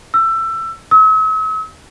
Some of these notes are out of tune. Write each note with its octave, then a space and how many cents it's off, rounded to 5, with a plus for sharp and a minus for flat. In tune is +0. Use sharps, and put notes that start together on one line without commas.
E6 +20
E6 -45